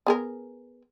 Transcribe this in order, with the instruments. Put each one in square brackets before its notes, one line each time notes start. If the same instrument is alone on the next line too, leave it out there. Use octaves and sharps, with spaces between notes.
[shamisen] B3 G#4 A#4